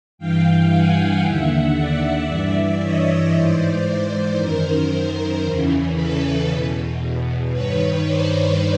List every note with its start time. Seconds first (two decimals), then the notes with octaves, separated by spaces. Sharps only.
0.18 G2 E3 F5 G5
0.71 F#5 G#5
1.23 D#2 D3 E5 F#5
1.75 D5 E5
2.28 G2 E3 D5 E5
2.80 C#5 D#5
3.33 G#2 E3 C5 D5
3.85 C5 D5
4.37 F#2 D#3 A#4 C5
5.43 E2 C#3 E3
5.95 A4 B4
6.47 E2 B2
7.52 G2 D#3 B4 C#5
8.04 C5 D5